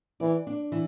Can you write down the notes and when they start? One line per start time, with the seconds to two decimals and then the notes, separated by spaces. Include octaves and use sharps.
0.20 E3 D5
0.47 D4
0.72 E3